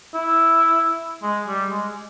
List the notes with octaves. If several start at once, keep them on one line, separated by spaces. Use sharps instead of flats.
E4
G#3
G3
G#3